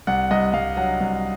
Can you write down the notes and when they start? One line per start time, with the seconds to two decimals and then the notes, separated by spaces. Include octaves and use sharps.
0.07 C2 F#5
0.31 C2 D#5
0.54 C2 F5
0.77 F#3 F#5
1.00 C2